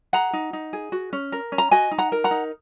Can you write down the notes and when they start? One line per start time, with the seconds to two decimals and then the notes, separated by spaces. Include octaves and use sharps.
0.13 G#4 F#5 A#5
0.33 D#4
0.53 D#4
0.73 G#4
0.92 F#4
1.13 C#4
1.32 A#4
1.52 C#4
1.58 A#5
1.71 F#4 D#5 G#5
1.91 D#4
1.98 F#5 A#5
2.12 A#4
2.24 F#5 A#5
2.31 D#4